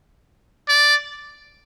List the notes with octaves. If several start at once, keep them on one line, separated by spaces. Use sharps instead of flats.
D5